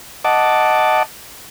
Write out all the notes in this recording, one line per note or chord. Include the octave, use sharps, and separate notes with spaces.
D#5 F#5 A5 D6